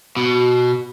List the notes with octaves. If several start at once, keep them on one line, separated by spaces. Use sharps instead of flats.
B2